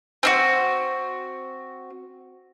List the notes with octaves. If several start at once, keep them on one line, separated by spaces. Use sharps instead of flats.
C4 E4 F#4